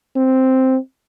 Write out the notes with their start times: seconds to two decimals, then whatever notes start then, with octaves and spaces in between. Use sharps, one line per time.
0.16 C4